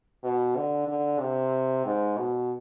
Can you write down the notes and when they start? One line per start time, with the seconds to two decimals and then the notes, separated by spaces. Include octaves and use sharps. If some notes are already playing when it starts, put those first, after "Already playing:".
0.24 B2
0.56 D3
0.87 D3
1.20 C3
1.85 G#2
2.17 B2